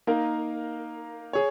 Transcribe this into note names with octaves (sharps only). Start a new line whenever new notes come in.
A#3 D#4 A#4 F5
G#4 C#5